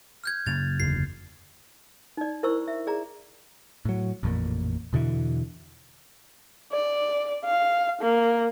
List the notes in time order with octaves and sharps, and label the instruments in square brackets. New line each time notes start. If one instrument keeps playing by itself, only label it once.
[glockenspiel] F6 G6 G#6
[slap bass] F#2 C#3 A#3 [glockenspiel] A6 F7
[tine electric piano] G1 E2 D3 [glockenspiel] C7
[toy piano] D#4 D5
E4 A#4 C5 C#6 E6
E5
G#4 D5 A#5
[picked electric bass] A2 F#3
A1 F2 A#2
E2 B2 D3 E3
[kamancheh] D5
F5
A#3